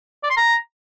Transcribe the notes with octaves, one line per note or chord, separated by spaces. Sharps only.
D5
C6
A#5